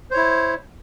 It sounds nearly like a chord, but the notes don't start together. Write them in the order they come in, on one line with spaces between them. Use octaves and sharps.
C5 C#5 E4